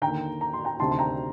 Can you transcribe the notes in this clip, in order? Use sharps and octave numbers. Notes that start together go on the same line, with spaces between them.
D#2 D3 G5 A#5
A#5
C6
G5 A#5
D2 C3 D#3 A5 C6
C6
G5 A#5